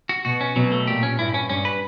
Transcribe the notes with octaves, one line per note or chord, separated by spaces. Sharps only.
F#4
B2 F#4
C#4
B2 F#3
A3
A#2 G4
C#4
G2 E4
C#4
G2 C#4
B4